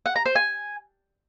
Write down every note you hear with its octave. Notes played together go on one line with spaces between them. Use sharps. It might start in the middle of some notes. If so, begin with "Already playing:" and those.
F#5
A#5
C5
G#5